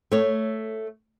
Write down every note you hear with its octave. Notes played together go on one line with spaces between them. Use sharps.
A3 C#5